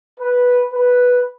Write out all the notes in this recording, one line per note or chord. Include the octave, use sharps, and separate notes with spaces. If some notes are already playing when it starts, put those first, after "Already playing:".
B4
B4